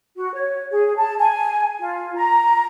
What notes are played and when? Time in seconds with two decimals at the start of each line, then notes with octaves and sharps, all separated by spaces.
0.16 F#4
0.33 C#5
0.71 G#4
0.96 A5
1.18 G#5
1.79 F4
2.15 A#5